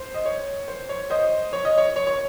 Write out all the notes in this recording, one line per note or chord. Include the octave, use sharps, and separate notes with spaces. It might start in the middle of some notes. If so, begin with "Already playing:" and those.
Already playing: C5
D#5
C#5
C5
C#5
C5 D#5
C#5
D#5
C#5
C#5
C#5